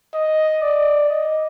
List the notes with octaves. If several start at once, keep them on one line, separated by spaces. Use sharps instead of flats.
D#5
D5
D#5